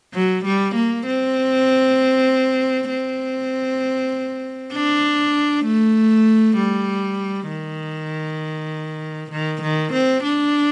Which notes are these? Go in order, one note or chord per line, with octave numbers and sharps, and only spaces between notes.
F#3
G3
A#3
C4
C4
D4
A3
G3
D#3
D#3
D#3
C4
D4